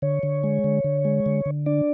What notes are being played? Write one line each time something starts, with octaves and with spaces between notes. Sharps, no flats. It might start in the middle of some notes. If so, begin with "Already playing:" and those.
D3 C#5
D3
G#3
D3
D3
G#3
D3
D3
D4 D5